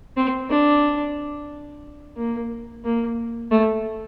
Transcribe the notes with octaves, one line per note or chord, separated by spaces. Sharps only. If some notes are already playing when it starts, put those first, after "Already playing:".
C4
D4
A#3
A#3
A3